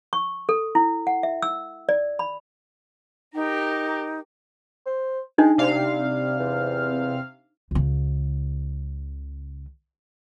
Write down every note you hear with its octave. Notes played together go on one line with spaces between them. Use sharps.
C#6
A4
E4
F#5
E5
E6
D5
B5
D#4 G4 A#4
C5
G#3 D4 D#4
C3 G3 F5
E2
C#2 C#3